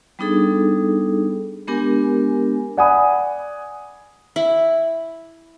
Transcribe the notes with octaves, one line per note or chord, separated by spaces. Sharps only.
G3 B3 D4 D#4 G#4 A4
G#3 B3 D4 G4 A#4 G#5
D5 F#5 G#5 B5 D#6
E4